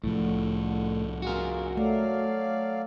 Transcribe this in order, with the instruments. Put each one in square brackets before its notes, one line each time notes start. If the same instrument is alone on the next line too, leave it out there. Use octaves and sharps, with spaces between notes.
[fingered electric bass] C2 F3 [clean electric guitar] A2 [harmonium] D3
[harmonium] F4 G#4 [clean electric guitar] F#4 A#4
[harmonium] F#3 D5 F5 [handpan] A3